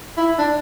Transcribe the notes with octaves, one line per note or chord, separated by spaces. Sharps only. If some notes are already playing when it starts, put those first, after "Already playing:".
E4
D4